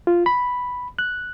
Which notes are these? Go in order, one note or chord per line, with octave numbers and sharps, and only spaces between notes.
F4
B5
F#6